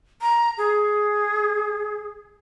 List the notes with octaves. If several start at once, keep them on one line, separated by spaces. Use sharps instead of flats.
A#5
G#4